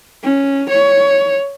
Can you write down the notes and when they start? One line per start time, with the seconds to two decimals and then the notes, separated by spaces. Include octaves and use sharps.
0.24 C#4
0.70 C#5